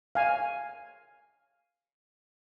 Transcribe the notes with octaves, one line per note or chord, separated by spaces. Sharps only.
F5 G#5